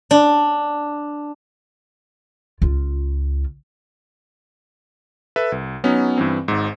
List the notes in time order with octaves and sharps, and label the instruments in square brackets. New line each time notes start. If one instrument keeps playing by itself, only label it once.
[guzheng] D4
[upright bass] C#2 F4
[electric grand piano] A4 B4 E5
C2
F#3 B3 C#4 D#4
G2 E3 C4
G#1 G#2